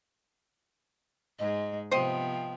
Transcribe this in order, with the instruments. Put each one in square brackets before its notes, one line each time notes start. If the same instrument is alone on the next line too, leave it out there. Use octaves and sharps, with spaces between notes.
[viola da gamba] G#2 G#3 [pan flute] D#5
[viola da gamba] C3 F3 B3 [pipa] C5 D#5 [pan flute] G5